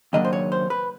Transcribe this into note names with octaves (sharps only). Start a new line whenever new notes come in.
D#2 C#3 F#3 A#3 D4 D#5
C5
C#5
C5
B4